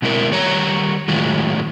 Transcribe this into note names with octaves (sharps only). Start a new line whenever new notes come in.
B2 G#3 C4 E4 A#4
D#3 G3 C#5 A#5
A2 D#3 E3 F#3 G#3 F4